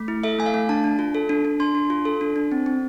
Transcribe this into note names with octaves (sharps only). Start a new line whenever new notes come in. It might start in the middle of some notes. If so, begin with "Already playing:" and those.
Already playing: A3
E4
A4 E5
A3 G#5
F5
A3
D4 A5
D4
F4
A4
D4
D4
D4 C6
D4
F4
A4
D4
D4
C4
C4